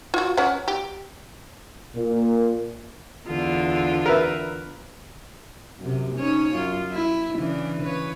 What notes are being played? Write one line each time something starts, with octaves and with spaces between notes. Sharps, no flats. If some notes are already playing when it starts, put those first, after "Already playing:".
F4 F#4
C#4 F#5
G4
A#2
E2 D3 F4
A#4 B4 E5
F#2 C3
C#4 D#4 C#5
F#2 F4
E4
C#3 E3 D4
C#3 B4 C#5